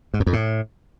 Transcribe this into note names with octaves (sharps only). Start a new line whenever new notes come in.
G#2
F#2
F2
A2